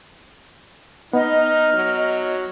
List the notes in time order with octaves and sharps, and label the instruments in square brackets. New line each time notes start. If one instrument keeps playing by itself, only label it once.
[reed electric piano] B3 [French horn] D#4 [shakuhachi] D#5 [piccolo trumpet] F6
[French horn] F#3